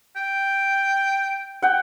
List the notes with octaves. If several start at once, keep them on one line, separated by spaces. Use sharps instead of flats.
G5
F#5 G5